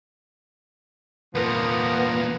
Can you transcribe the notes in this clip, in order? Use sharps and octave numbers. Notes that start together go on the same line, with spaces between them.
E2 A#2 F3 B3 A#4